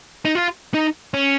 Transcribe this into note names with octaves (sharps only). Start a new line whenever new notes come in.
D#4
F4
D#4
C#4